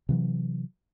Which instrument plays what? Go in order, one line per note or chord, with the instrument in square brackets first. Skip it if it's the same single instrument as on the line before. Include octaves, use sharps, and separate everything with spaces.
[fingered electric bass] C3 E3 F#3